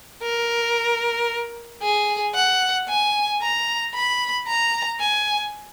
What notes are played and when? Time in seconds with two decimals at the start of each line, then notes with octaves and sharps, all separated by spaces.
0.22 A#4
1.82 G#4
2.35 F#5
2.89 G#5
3.42 A#5
3.95 B5
4.48 A#5
5.00 G#5